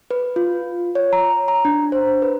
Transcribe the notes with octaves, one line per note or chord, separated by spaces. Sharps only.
B4
F4
C#5
A#5
A#5
D4
C5
B4